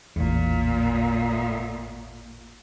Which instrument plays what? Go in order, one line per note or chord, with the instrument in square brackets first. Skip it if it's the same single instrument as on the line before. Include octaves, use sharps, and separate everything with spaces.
[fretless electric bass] A1 E2 [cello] A#2